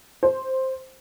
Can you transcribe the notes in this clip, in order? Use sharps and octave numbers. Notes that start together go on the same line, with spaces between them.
C5